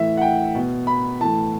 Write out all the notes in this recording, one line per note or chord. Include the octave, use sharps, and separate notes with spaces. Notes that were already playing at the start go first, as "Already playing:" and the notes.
Already playing: A2 E3 E5
F#5
G5
B2
B5
A2 E3 A5